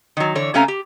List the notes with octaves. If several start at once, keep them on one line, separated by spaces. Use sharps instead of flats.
D#3 F#3
D3 E3 C#5
C3 A3 C#4 F5 G#5 A#5
G4